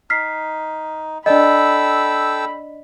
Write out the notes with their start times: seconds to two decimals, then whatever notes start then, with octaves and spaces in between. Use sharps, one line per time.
0.10 D#4 F6 B6 C7
1.26 D4 A4 D5 D#5 G5 B5 E6